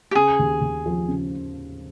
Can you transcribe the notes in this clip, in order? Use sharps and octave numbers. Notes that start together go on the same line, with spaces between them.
G4
C#3 G#4
D#2
D#2
F3
C#3